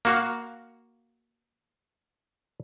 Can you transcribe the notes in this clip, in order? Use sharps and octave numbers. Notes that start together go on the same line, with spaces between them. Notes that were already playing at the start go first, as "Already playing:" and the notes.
A#3 F#4 F5